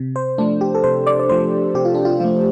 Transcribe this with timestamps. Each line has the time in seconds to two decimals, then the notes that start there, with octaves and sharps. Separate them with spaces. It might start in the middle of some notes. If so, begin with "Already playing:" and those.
Already playing: C3
0.16 C5
0.38 F3 A3 D4
0.61 G4
0.75 A4
0.84 C3 C5
1.07 D5
1.20 D5
1.29 F3 A3 C5
1.74 C3 G4
1.85 F4
1.95 D4
2.05 F4
2.20 F3 A3 F4